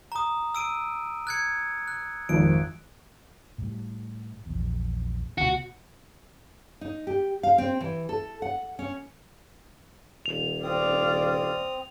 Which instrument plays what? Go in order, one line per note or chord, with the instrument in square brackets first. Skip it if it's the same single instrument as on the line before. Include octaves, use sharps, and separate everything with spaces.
[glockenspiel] A#5 D#6
E6 D7 D#7
F#6 G#6 C#7
F#6
[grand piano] G#1 F2 [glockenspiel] D7
[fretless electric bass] A2 G3
A#1 E2
[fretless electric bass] D2 B2 [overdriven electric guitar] F#4
[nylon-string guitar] D#4
G4
F5
C4
E3
A4
F#5
C#4
[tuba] D#1 [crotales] F7
[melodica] C4 D#6 [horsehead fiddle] D5 F5